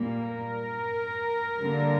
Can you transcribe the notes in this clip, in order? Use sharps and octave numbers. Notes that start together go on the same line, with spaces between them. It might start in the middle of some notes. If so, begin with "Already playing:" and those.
Already playing: A#2 G3 A#3
A#4
D3 G3 A#3